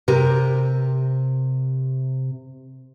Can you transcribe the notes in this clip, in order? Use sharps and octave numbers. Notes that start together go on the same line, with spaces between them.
C3 G4 A#4